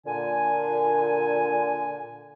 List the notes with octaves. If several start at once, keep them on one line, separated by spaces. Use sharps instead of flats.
A#2 D3 G#5